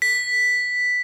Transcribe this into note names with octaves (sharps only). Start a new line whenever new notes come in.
B6